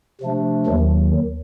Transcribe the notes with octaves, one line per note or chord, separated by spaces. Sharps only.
C3 F3 A3 D4
D#2 D#3 F#3